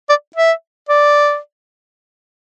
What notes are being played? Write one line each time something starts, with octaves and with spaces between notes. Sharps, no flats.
D5
E5
D5